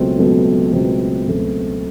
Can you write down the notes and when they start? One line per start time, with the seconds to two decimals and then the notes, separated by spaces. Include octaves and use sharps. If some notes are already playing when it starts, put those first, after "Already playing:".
Already playing: C#2 B2 F#3 A3 C4
0.18 C#2 B2 F#3 A3 C4
0.72 C#2 B2 F#3 A3 C4
1.27 C#2 B2 F#3 A3 C4